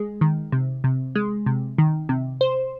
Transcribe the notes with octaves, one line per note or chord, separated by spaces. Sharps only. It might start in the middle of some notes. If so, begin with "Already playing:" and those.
Already playing: G#3
D#3
C3
C3
G#3
C3
D#3
C3
C5